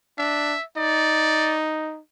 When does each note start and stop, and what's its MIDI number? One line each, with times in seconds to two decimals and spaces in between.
0.18 0.55 62
0.18 0.63 76
0.77 2.00 63
0.77 1.57 74